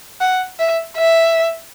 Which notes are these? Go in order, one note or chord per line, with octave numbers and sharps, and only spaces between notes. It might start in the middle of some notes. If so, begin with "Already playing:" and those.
F#5
E5
E5